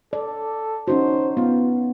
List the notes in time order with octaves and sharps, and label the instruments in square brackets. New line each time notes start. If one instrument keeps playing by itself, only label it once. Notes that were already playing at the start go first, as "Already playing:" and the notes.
[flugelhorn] A4 [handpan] D5
[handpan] C#4 D#4 F#4 [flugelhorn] C5
[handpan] B3 [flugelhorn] F4